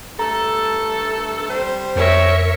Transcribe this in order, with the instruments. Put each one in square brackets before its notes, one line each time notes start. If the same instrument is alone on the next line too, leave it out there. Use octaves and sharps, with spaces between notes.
[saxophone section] G2 A3 A4 [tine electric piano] A#5
[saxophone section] G3 C4 C5
[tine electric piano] F2 [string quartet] A#4 C#5 E5